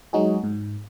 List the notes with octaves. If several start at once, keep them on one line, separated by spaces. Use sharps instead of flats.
F#3 G#3 D#4 F#4 G#4
G#2